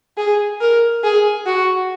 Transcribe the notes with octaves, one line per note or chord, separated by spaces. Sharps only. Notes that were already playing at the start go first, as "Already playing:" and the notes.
G#4
A#4
G#4
F#4